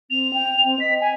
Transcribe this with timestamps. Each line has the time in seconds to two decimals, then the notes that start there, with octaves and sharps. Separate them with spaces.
0.10 C4 F7
0.33 G5
0.63 C4
0.80 D#5 B6
1.01 G#5